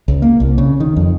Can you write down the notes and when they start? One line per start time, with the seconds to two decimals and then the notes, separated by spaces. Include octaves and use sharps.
0.08 C#2
0.22 A#3
0.40 C2
0.58 C#3
0.80 D#3
0.96 F2